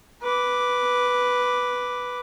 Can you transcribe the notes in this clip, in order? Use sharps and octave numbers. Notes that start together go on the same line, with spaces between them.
B4 D6